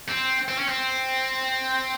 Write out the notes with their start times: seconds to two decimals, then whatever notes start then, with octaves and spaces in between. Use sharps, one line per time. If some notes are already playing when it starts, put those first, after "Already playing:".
0.09 C4
0.48 C4
0.58 C#4
0.68 C4